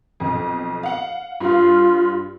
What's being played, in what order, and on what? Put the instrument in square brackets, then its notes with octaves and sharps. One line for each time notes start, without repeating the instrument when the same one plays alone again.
[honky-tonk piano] B1 F2
F5 F#5
[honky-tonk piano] G2 F5 [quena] F4